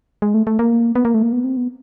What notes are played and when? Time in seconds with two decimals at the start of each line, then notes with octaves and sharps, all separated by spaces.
0.22 G#3
0.34 A3
0.47 A3
0.59 A#3
0.95 B3
1.05 A#3
1.14 A3
1.23 A#3
1.33 B3
1.44 C4
1.57 B3